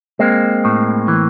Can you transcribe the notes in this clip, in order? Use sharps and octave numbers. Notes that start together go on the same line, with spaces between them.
G#3 A#3 C4
A2
E3